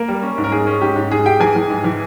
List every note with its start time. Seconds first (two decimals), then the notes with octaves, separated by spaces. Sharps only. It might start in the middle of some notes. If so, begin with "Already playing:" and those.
Already playing: A#3 A#4
0.08 G3
0.22 C#4
0.38 G#2
0.44 A#4
0.52 G#2 G#4
0.67 C#4
0.81 G#2 G4
0.96 G#2
1.11 G#2 G#4
1.26 G#2 G4 G5
1.40 E3 G#4 G#5
1.55 E3
1.70 G#2
1.84 E3